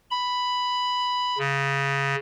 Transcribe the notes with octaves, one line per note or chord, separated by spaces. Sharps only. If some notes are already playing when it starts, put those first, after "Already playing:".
B5
C#3